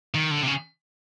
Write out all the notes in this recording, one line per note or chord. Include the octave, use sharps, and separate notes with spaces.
D#3
D3
C3
C#3